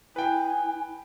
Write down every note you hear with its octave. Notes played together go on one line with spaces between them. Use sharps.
E4 B4 G5 G#5